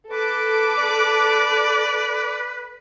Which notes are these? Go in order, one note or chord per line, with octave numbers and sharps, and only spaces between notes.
A4 B4 D6
D5